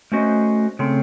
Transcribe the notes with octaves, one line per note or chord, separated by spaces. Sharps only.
A3 C#4 F#4 C5 D#5
C#3 A3 C4